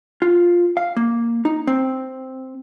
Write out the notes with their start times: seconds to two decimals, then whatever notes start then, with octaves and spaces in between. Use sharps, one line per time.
0.22 F4
0.77 F5
0.97 A#3
1.45 D#4
1.67 C4